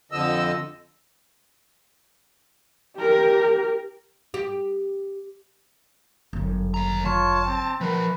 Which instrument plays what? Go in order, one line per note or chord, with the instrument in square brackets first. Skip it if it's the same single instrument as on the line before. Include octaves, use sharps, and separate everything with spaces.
[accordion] F2 D3 F3 D#5 E6
[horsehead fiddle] G4 A#4
[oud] G4
[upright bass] G1 F#2
[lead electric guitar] D#2 A#5
[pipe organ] F4 C#5 [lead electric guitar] A5
[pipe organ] C4
[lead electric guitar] F3 A#4 [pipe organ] B4